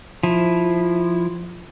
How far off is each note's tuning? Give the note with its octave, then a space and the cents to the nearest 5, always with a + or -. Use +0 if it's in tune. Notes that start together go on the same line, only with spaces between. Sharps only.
F3 +0 E4 +0